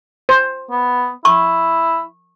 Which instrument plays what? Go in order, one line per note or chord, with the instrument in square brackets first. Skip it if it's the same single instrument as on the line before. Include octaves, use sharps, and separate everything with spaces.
[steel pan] C5
[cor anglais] B3
[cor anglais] E4 [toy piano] C#6